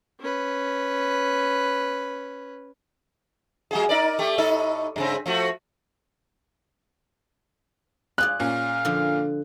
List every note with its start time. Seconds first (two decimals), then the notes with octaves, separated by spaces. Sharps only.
0.20 C#4 B4
3.71 G3 F#4 G#4
3.89 D#4 A#4 D5
4.19 A3 G4
4.38 A2 D#4 A4
4.96 G2 C#3 C4
5.26 F3 A3 F#4
8.18 F4 G#4 D5 F#6
8.40 A#2 C#4 F5
8.85 D3 F3